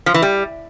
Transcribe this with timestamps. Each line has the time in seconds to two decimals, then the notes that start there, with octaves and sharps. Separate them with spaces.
0.06 F3
0.14 E3
0.22 G3